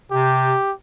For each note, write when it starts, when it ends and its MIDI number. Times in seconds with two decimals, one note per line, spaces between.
0.11 0.54 48
0.11 0.72 67